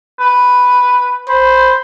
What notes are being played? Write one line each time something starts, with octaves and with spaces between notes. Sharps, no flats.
B4
C5 B5